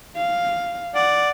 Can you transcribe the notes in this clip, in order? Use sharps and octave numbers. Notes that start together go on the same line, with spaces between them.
F5
D5 F#5